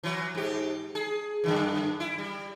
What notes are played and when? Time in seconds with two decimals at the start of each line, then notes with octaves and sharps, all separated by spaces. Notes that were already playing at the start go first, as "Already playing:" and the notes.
0.03 E3 F#3
0.35 G#2 G4
0.95 G#4
1.44 F#2 D3 E3
2.00 E4
2.18 G3